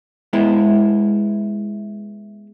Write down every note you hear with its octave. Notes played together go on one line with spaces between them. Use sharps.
G#3 B3 E4